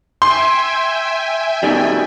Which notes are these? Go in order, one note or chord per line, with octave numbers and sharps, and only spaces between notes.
E5 G5 G#5 C6
B2 D#3 G3